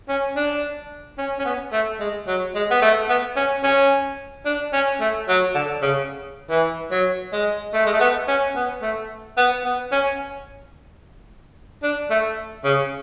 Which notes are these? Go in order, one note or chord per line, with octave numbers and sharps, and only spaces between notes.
C#4
D4
C#4
C#4
B3
A3
G#3
F#3
G#3
B3
A3
B3
C#4
C#4
D4
C#4
A3
F#3
D3
C#3
E3
F#3
G#3
A3
G#3
A3
B3
C#4
B3
A3
B3
B3
C#4
D4
A3
C#3